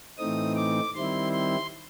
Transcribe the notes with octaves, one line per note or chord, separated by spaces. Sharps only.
A2 E3 A3 C4 D#4 D#6
D6
D#3 G3 C4 E4 C6
C6